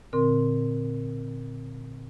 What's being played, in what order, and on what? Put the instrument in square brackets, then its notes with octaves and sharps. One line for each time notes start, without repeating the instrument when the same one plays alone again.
[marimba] A#2 D3 C4 A#4 C6